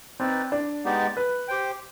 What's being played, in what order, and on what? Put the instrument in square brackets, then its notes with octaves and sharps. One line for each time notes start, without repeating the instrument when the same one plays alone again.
[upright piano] C4 [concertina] D#4 B4 D5
[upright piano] D4
[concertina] G#3 B3 D#4 G4 D5
[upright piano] B4
[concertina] G4 C5 G5